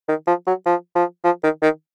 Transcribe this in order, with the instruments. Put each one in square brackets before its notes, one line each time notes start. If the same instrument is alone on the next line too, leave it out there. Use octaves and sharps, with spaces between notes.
[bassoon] D#3
F3
F#3
F3
F3
F3
D#3
D#3